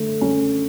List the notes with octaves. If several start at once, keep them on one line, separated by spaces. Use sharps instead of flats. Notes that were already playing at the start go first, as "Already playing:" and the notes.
Already playing: D3 A3
C#4